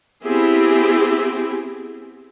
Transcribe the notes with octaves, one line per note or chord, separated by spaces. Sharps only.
B3 C4 E4 G4 G#4